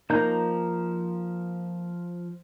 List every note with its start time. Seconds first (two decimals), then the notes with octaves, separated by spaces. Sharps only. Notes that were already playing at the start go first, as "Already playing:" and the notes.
0.10 F3 A#3 D#4 A#5 G6